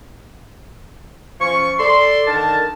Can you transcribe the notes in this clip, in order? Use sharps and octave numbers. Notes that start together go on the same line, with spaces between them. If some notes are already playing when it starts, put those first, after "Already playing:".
F3 C#4 C#6
A4 D5 C6
D3 D#3 A#4 A5